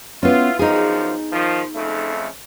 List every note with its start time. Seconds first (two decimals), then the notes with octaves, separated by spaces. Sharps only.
0.23 B3 C#4 E4 F4
0.59 F#2 F3 D#4 G#4
1.32 D#3 F3
1.75 F2 C#3 A3